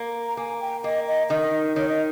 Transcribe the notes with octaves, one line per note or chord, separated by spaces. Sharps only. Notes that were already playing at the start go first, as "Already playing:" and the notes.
Already playing: A#3
A#5
A#3 G#5
G5
A#3 D#5
D#5
D#3 D#5
D#3 C#5
D#5